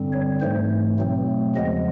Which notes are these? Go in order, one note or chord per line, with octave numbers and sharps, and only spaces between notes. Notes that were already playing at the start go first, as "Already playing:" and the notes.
Already playing: G2 D3 G3 C4
C#5
G#2 E3 A3 C5
B2 F#3 A3 C4
E2 C#3 F3 G#3 B3 D#5